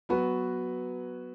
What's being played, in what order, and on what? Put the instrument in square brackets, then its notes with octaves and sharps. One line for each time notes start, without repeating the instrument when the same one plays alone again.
[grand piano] F#3 B3 F#4 B4